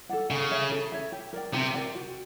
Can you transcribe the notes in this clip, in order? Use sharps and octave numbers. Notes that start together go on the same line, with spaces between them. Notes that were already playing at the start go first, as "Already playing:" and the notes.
A4 D5 F#5
C#3 A4
C#5 E5
A4
C#5 E5
G4
A#4 D5 G5
C3 G4
A#4 D5 G5
F#4